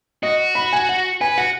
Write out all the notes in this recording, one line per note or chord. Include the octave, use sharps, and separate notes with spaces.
F#4 D#5
B5
G#5
F#5
B4 G#5
F#4 F#5